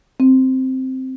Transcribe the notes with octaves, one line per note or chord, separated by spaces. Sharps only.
C4